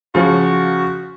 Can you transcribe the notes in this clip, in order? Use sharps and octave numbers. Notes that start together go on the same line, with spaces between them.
C#3 F3 F#4